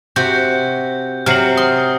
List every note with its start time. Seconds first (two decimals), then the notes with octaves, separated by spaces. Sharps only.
0.16 C3 F#4 G6
1.26 C3 F#3 F6 C7 F#7
1.57 C6 D#6